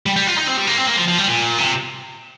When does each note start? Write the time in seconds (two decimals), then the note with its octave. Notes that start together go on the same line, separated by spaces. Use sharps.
0.06 G3
0.16 G3
0.27 F4
0.37 D#4
0.47 C4
0.57 G3
0.67 A#3
0.77 C4
0.87 A#3
0.97 F3
1.08 F3
1.18 G3
1.28 A#2
1.58 C3